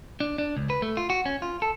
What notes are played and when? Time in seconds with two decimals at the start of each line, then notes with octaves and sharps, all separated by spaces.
0.20 D4
0.38 D4
0.56 C#2
0.70 B4
0.82 A3
0.97 F4
1.10 F#4
1.26 C#4
1.42 F4
1.62 A4